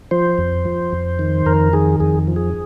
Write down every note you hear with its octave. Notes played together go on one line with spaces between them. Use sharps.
F3 C5
F2
F3
F2
D#3
F2 A#4
D#3 G#4
F2 G#4
F3
G#4